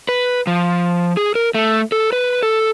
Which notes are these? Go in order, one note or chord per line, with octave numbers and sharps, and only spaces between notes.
B4
F3
G#4
A#4
A3
A4
B4
A4